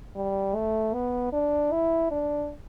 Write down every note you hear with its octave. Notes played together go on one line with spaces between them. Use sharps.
G3
A3
B3
D4
E4
D4